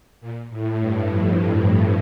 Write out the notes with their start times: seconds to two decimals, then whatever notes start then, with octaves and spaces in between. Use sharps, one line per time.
0.21 A#2
0.50 A2
0.79 G2
1.08 F2
1.52 F2